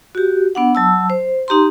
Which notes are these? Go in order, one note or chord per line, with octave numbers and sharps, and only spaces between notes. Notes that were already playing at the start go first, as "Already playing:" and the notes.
F#4 G4
B3 D4 F#5
F#3 A5 E6
C5
D#4 G4 A#5 C6